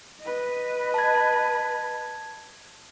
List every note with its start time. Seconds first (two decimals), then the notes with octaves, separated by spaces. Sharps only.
0.21 B4 D#5
0.94 A5 G#6